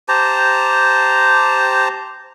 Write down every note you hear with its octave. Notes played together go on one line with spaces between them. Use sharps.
G4 C5 A5 A#5